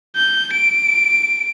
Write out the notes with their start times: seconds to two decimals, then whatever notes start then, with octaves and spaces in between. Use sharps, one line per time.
0.16 G6
0.53 D7